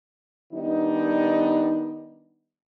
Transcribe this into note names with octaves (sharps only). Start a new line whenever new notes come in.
D#3 G3 B3 D4 D#4